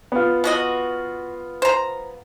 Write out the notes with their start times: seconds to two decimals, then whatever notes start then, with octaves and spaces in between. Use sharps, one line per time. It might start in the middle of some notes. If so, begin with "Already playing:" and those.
0.12 B3 F4
0.44 B2 F#4 D#5
1.62 C5 A#5